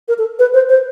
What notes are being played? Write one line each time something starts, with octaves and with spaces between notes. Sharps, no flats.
A#4
A4
B4
C5
C5